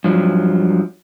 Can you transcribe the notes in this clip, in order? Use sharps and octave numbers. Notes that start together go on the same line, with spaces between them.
G2 F3 F#3